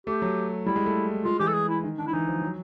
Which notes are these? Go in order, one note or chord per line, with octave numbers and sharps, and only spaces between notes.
A3 G4
F#3
G3 E4
G#3
A3
G#3 F4
E3 G4
A4
G#4
E4
D#3
D3 D4
E4
E3 D#4
F3
F#3